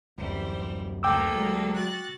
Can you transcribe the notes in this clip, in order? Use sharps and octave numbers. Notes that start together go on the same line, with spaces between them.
D1 F#2 E3 G3 C5
D2 A#3 A4 G5 D6 E6
F#3 G#3
F#4 F#6 A6